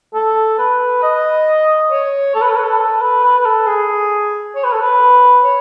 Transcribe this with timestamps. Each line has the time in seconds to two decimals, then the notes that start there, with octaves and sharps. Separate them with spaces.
0.14 A4
0.58 B4
1.03 D#5
1.91 C#5
2.35 A4
2.42 B4
2.49 A4
2.56 B4
2.64 A4
2.79 A4
3.01 B4
3.23 B4
3.39 B4
3.45 A4
3.67 G#4
4.55 C#5
4.64 B4
4.72 A4
4.82 B4
5.44 C#5